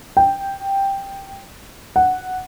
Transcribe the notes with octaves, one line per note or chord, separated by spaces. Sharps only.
G5
F#5